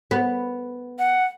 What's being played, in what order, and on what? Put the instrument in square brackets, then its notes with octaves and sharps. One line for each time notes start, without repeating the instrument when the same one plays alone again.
[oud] B3
[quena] F#5